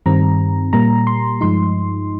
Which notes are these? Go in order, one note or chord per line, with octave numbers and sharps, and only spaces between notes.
G2 D#3 G3 C4 A#5
A#2 G3 A#3 A#5
C6
G2 F3 G#3 D#4 C6